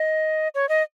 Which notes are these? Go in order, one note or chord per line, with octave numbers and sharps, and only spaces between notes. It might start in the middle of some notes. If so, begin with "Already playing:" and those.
Already playing: D#5
C#5
D#5